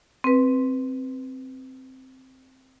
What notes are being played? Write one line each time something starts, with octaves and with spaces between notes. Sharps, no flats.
C4 B4